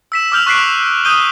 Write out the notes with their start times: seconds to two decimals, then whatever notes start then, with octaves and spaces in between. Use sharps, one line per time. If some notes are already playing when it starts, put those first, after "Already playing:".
0.12 E6 B6 E7
0.32 D6 E6 F6 G6 F7 F#7
0.46 C#6 F#6 B6 C7 D7
1.05 D#6 G6 D#7 G7